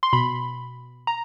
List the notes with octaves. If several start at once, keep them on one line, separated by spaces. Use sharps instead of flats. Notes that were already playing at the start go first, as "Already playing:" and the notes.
C6
B2 B5
A#5